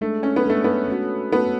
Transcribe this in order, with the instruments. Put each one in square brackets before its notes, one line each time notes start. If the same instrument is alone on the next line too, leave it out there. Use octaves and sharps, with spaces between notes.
[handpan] G#3 D4 A4 [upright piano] A3
[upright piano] C#4
B3
[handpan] G#3 D4 A4 [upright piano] A3
[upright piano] B3
[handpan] A3 C#4 F#4 A4
[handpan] A3 C#4 F#4 A4 [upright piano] B3